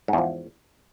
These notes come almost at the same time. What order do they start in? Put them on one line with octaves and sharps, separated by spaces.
G#2 E2 F3